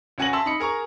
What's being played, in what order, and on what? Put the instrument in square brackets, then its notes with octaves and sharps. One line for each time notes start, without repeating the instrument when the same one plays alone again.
[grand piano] C#2 C#4 F#4 G#5 A#6 F#7
E5 A5 C6 E6
D#4 B5 C#7
G#4 A#4 A#5 C#6